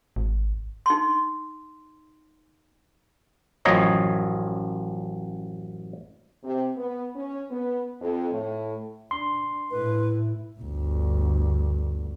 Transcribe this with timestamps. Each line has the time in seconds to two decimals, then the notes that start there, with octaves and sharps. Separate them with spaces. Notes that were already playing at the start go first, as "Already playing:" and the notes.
0.16 G#1
0.86 D#4 C6
3.65 A1 F#2 F3 C#5 D#5 A#5
6.43 C3
6.77 B3
7.15 C#4
7.50 B3
8.00 F2
8.31 A2
9.11 D4 C6
9.71 A2 E4 B4
10.59 G1 D2